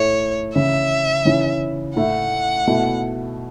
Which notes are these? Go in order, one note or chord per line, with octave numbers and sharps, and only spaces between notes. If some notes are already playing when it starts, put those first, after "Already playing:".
Already playing: A2 A3 E4 C#5
C#3 E3 C#4 E4 E5
C#3 E3 C#4
A2 A3 E4 F#5
B2 A3 E4